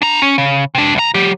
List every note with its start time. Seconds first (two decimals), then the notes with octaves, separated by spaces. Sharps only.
0.02 D4 A#5
0.22 C#4
0.38 C#3
0.75 C3 D4
0.95 C2 A#5
1.14 F#3 G4